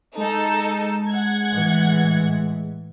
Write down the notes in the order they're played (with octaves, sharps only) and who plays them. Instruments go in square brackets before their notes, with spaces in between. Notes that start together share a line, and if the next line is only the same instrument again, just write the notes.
[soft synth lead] G#3 [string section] D#4 A4
[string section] F#5 G#6
[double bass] A2 E3